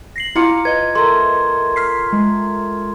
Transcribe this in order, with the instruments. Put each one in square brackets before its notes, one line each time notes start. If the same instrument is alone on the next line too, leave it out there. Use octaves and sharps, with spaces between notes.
[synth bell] A#6 C7 F#7
[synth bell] E4 C#7 [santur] F4 A#5 D6
[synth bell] B4 D#5 [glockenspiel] G#6
[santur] A3 A#4 [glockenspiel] C6
[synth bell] F6 B6 C7
G#3